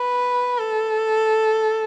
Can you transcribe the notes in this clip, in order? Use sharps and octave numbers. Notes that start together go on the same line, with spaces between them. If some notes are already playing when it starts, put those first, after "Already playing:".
Already playing: B4
A4